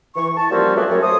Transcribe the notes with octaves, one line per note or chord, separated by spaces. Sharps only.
E3 C#6
A5
F3 G3 A#3 C4 C#4 F#4
F#3 A3 B3 D4 F#4 G#4
F#2 C#5
A4 C5 E5 D#6